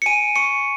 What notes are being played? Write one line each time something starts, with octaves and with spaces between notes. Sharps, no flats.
C#7
G#5 D#7
C#6 C#7